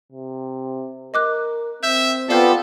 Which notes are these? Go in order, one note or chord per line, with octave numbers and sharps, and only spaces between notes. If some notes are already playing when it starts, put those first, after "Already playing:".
C3
A#4 D#5 D6 F#6
C4 E5 G6
B3 F4 G4 A4 D5 F5 G6